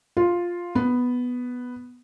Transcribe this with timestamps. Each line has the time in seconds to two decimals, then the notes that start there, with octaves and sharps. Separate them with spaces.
0.17 F4
0.75 B3